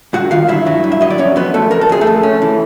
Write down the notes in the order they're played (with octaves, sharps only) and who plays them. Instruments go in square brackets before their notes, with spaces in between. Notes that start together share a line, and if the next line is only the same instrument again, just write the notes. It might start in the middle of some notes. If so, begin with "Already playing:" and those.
[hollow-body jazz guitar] G2 F#4 F#5
D#3 F4 F5
G2 E4 E5
F#3
G2
E5
F#3 D#5
D5
F2 C#4 C#5
F2 B3 B4
F2 A3 A4
F2 A#4
A4
F2 G#4
A3 A4
F2
C#4
E3